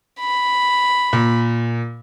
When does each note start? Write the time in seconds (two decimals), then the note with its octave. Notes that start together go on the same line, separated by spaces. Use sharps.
0.20 B5
1.13 A#2